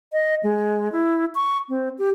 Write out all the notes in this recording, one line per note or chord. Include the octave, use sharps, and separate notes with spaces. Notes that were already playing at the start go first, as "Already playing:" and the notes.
D#5
G#3
E4
C#6
C4
G4